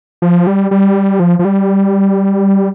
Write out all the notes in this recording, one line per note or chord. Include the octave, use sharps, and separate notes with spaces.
F3
G3
G3
F3
F3
G3